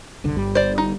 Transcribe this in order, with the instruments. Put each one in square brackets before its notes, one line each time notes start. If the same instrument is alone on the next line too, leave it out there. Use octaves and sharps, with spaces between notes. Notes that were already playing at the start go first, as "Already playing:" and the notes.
[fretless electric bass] F#1 C2 D3
[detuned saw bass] G1 [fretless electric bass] G3
[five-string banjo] C5 D5
D#4